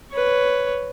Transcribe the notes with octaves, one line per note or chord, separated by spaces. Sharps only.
B4 C#5